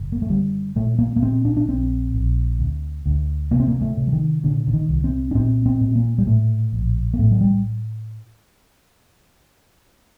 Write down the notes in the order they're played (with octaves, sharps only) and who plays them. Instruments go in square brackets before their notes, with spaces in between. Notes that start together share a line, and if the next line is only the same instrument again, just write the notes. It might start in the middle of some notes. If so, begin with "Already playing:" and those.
Already playing: [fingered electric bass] F#1
A#3
A3
D3 G3
A#2 A3
A#3
A#3
A#2 C4
D4
D4
A#1 C4
A#1
D2
D2
C3 A#3
C4
A#3
A3
C3
F#3
D#3
A#2 D3
D3
D#3
C2
C4
D4
A#2 C4
C4
A#2
A#3
G3
A2 A3
A#1
A#3
A2 A3
F#3
G3